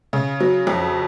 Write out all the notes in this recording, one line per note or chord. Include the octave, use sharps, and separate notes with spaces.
C#3
F#3
F2